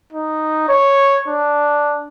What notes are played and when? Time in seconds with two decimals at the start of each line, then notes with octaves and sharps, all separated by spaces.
0.13 D#4
0.69 C#5
1.28 D4